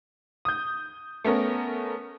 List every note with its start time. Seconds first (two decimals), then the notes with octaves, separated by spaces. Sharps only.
0.45 D#6 G6
1.24 A3 B3 C#4 A#4